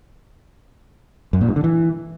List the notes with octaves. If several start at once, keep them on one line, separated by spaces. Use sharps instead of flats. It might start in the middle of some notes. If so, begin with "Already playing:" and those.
F#2
A#2
G2
D3
E3